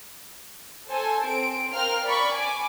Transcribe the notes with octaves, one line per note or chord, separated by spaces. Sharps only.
A4 C5 G#5
C4 D7
A#4 C5 F5 G5 F6
D5 B5 C#6
G#5 D6